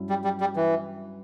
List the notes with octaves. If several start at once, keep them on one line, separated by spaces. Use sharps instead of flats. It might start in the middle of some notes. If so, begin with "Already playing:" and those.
Already playing: G2 F#3 C#4 E4
G3
G3
G3
E3